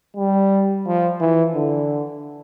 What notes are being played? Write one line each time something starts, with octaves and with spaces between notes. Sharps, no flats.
G3
F3
E3
D3